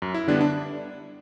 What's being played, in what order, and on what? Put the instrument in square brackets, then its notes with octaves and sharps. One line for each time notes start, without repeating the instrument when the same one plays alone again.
[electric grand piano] F#2
E4
D3 G3 B3 D4
D4